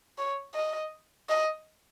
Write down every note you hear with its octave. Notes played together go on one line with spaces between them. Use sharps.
C#5
D#5
D#5